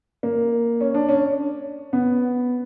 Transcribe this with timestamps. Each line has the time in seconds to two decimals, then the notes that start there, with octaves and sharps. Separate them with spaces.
0.23 A#3
0.81 C#4
0.94 D4
1.09 C#4
1.93 B3